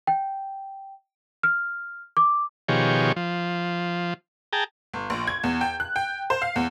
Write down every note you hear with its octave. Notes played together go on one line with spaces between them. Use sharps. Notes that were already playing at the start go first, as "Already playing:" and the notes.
G5
F6
D6
B2 D#3 F3 G4 G#4 C#5
F3
G#4 G5 A5 A#5
G1
A#1
G#6
E2
G5
F#6
G5
C5
F5
E2